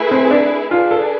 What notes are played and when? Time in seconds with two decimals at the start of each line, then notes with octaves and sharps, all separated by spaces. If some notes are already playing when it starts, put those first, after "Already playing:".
Already playing: A3 E4 G#4 B4
0.11 C4
0.31 D4
0.71 D4 F4 G#4 B4
0.91 A4